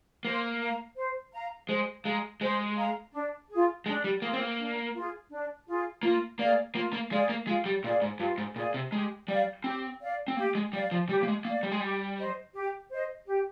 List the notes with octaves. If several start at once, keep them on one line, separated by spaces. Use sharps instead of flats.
A#3 C5
F5 A#5
C5
F5 A#5
G#3 C5
G#3 F5 A#5
G#3 C5
F5 A#5
D4
F4 G#4
G#3 D4
G3
A#3 F4 G#4
C4
A#3
D4
F4 G#4
D4
F4 G#4
A#3 F4
A#3 G#4 D5 F5
A#3 F4
A#3
G#3 G#4 D5 F5
A#3
G#3 F4
G3
A#2 G#4 D5 F5
G#2
G2 F4
G#2
A#2 G#4 D5 F5
C3
G#3 G4
G3 D5 F5
C4 G4
D5 F5
C4
A#3 G4
G#3
G3 D5 F5
F3
G3 G4
A#3
G#3
A#3 D5 F5
G3
G#3
G3 G4
C5 D#5
G4
C5 D#5
G4